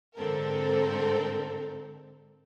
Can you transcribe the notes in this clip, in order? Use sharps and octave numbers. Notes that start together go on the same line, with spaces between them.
G#2 D3 C4 A4 A#4